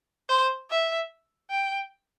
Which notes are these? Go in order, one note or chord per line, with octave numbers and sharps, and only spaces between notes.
C5
E5
G5